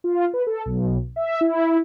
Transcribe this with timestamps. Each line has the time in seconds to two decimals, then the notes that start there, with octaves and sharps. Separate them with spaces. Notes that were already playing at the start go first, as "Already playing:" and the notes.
0.04 F4
0.34 B4
0.47 A4
0.66 B1
1.16 E5
1.41 E4